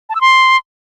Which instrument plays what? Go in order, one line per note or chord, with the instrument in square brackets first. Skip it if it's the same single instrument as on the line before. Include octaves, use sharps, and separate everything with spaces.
[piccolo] A5
E6
C6